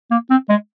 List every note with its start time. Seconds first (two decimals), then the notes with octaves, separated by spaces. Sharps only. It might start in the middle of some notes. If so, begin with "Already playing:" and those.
0.11 A#3
0.30 C4
0.49 G#3